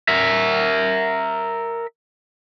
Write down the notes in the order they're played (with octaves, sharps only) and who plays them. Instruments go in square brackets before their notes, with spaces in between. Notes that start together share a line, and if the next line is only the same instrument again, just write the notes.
[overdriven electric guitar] A#4 E5